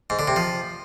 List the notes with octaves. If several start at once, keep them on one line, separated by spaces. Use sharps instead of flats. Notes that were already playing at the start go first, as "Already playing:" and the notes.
G#2
D3
C3
F3